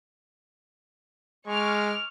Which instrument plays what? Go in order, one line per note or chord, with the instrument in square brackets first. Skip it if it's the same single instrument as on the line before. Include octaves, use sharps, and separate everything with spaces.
[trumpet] G#3 [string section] C#6 D6 F6